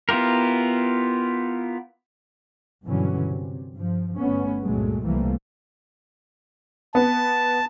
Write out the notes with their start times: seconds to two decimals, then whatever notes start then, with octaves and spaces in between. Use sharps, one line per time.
0.09 B3 E4 F4 G4 A#4
2.85 G2 B2 D3 E3 F#3 C#4
3.28 C3
3.74 G2 F3
4.16 G1 A3 B3 C#4
4.62 C#2 G2 A#2 F#3 G#3 A3
5.04 C2 E3 F3 G3 A3 A#3
6.95 B3 A5